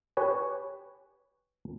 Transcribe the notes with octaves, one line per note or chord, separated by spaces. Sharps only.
G4 B4 C#5 G#5